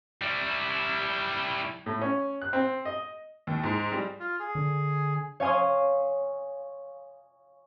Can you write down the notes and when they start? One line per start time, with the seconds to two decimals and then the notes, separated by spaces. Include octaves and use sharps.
0.22 G3 E4
1.86 A2
2.01 C#4
2.42 F#6
2.53 C4
2.85 D#5
3.47 D#2
3.64 G#2
3.92 G3
4.20 F4
4.40 G#4
4.55 D3
5.40 C#5 F5 G#5 C6 D#6